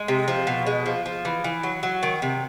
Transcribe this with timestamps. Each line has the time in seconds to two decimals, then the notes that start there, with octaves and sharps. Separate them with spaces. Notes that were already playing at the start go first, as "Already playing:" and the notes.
Already playing: G#3
0.08 C3
0.28 F3
0.47 B2
0.67 G#3
0.86 F3
1.06 F3
1.25 E3
1.44 E3
1.63 F#3
1.83 F#3
2.03 D#3
2.22 C3